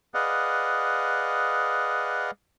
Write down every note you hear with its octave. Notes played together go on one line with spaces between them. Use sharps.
G#4 B4 D5 D#5 F5 F#5